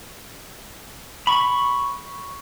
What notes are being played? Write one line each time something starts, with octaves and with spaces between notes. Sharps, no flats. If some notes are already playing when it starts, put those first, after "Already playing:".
B5 C#6